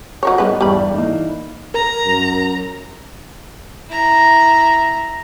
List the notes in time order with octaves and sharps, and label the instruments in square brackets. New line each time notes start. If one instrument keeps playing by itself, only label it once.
[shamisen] F#3 A#4 C#5
[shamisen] D#3 E3 B4 [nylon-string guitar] G3 B3 G#4
[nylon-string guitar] E2 G2 [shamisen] G3 B5
[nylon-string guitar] E3 A#3 D#4
[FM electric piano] A#4 [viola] A#5
[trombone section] F#2
[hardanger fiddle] E4 A#5